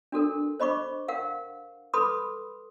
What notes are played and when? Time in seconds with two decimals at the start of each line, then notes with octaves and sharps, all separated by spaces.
0.12 D4 F#4 A4 A#4
0.60 C5 D#5 B5 C#6 D6
1.08 A#4 F5 F#5
1.94 A4 B4 B5 C6 D6 D#6